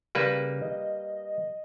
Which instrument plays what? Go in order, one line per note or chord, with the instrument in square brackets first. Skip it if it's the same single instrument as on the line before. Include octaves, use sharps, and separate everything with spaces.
[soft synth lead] C#3 [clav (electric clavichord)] G3 A#3 B4
[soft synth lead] D#5